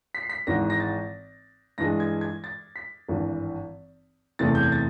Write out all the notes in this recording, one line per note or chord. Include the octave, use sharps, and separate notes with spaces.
B6
C7
B6
G#1 G#2 E3 A#6
A#6
A6
G2 E3 G#3 A#6
G#6
G#6
A6
B6
G#1 G2 E3
F#1 E2 C3 E3 A3 A6
G6
G#6
A6